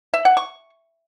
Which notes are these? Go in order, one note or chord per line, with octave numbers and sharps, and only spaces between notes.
E5
F#5
C#6